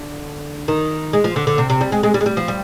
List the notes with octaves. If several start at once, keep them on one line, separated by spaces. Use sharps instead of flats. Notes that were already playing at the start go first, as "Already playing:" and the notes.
Already playing: D3
D#3
G#3
F3
D3
D3
C3
C3
G3
G#3
G#3
G3
G#3
G3
F3
G3